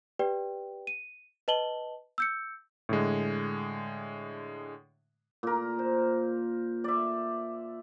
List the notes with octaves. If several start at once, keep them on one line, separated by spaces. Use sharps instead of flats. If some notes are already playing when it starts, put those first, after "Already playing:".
G4 B4 D5 G5
D#7
B4 D#5 A5 F#7 G7
E6 G6 C#7
A2 D3 G#3
A#2 A#4
C5
D5 E5